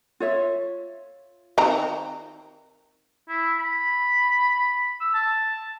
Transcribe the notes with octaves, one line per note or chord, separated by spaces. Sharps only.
F4 C#5 E5
D#3 C4 A#5
E4
B5
E6
A5